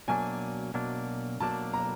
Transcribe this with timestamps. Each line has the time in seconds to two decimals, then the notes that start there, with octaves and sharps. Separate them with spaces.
0.08 B2 F#3 A#3 D4 G#5
0.74 B2 F#3 A#3 D4
1.40 B2 F#3 A#3 D4 A5
1.73 A#5